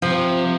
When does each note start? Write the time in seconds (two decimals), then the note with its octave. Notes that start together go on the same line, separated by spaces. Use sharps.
0.02 C3 F3